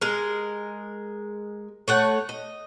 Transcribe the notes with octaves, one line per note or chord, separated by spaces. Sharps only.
G#3 A#4
A3 C#5 F#5
D#5